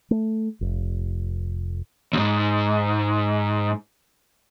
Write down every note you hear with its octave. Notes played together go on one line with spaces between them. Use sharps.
A3
F1
D2 G#2